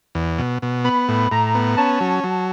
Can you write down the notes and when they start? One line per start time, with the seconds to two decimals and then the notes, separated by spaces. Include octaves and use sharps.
0.15 E2
0.38 B2
0.62 B2
0.85 B3 B5
1.09 A2
1.32 A2 A#5
1.55 B3
1.77 C#4 A5
2.01 F#3
2.24 F#3